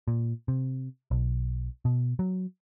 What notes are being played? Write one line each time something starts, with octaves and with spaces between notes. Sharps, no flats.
A#2
C3
B1
B2
F#3